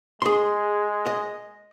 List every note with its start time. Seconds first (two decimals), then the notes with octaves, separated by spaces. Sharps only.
0.22 G#3 G#4 C6
1.06 D#5